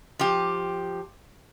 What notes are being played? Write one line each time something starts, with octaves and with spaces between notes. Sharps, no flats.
F3 G4